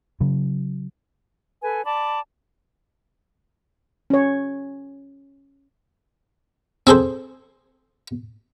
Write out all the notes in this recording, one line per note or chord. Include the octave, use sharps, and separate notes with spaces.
C#3 F#3
A4 B4 G#5
D5 A5 B5 D6
C#4 C#5
C4 G#4 A4 C5